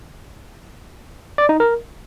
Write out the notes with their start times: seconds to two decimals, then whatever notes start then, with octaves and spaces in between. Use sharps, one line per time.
1.38 D5
1.49 D#4
1.60 A#4